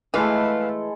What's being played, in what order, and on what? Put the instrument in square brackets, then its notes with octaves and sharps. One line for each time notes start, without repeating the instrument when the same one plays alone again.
[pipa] E3 [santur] G#3 E4 A4 [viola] A3 [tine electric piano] B4 F5